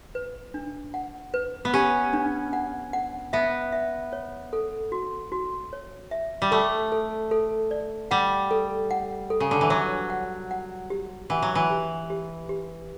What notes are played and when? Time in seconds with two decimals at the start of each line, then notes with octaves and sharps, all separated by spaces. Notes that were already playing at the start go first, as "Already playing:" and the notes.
0.15 B4
0.54 D4
0.94 F#5
1.34 B4
1.65 B3
1.73 C#4 G4
2.13 D4
2.53 F#5
2.93 F#5
3.33 B3 E5
3.72 E5
4.13 C#5
4.53 A4
4.92 F#4
5.32 F#4
5.73 C#5
6.11 E5
6.42 G3
6.51 A3 A4
6.92 A4
7.31 A4
7.71 D5
8.11 G3 F#5
8.51 A4
8.91 F#5
9.30 A4
9.40 C#3
9.51 D3
9.61 E3
9.70 F#3 C#5
10.10 F#5
10.51 F#5
10.90 G4
11.30 E3 F#5
11.42 F#3
11.55 E3
11.70 G4
12.10 G4
12.49 G4